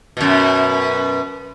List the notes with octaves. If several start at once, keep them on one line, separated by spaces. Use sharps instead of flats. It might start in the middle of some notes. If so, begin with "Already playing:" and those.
F#2 B2